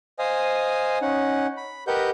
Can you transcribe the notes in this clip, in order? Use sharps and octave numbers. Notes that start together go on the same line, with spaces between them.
C5 D#5 F5 G#5 D#6
C#4 D#4 F#5
B5
G4 A#4 B4 D#5 F#5 G6